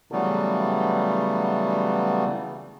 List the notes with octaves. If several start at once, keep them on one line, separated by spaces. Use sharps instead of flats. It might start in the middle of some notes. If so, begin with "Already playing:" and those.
C#3 E3 F#3 G3 A3 B3